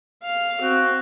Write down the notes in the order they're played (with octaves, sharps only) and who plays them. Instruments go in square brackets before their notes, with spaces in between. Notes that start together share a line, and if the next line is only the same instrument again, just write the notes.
[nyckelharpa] F5
[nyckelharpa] C4 [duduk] F#4